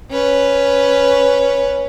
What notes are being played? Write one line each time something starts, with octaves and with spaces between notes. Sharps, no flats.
C#4 B4